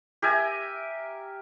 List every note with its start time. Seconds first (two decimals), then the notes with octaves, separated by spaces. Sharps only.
0.22 G4 A#4 E5 G#5